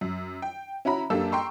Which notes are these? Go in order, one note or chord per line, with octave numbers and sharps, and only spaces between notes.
F#2
G5
C#4 E4 F#4 A#5 B5
F#2 A#3 D4 G4 A4 E6
G5 A#5 C6 C#6